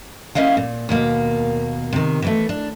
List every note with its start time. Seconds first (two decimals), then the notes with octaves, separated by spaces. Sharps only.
0.35 A#3 C#4 E4 D#5 F5
0.57 A#2
0.89 D#2 B2 A#3
1.93 C3 D#3
2.22 E3 G#3 A3
2.49 D4